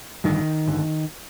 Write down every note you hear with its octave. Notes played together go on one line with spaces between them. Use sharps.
A1 G2 D3 D#3
A1 G2 D3